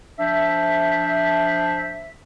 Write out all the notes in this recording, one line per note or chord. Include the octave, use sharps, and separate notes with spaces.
F3 D4 C5 E5